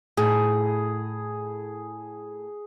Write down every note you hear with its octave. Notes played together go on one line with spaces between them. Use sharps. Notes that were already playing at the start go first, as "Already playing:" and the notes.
A2 G#4